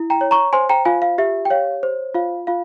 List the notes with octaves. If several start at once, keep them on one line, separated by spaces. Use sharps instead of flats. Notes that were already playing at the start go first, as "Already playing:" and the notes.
Already playing: E4
G5 A#5
C#5
A#5 C#6
C5 G#5 C6
G5 A#5
F4 F5 G#5
F5
G4 E5
G5
C#5 F5
C5
F4 F5
F4 F5